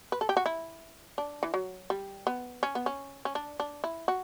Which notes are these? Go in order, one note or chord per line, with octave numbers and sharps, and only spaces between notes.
B4
A4
G4
F#4
E4
D4
E3
F#3
G3
B3
C#4
B3
C#4
C#4
D4
D4
E4
F#4